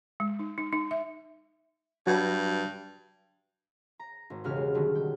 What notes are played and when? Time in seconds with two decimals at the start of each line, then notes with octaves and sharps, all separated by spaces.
0.20 G#3
0.39 D#4
0.58 D#4
0.72 D#4
0.91 E5
2.07 G2 F#3 F#4 B4
4.00 A#5
4.30 G#1
4.44 E1 B1 C#3 F#4 G4 F6
4.57 G#3
4.74 B2 D3 D#3 F#3 G3
4.95 G5